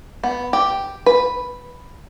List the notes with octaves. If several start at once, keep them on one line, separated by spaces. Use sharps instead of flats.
B3
G4
B4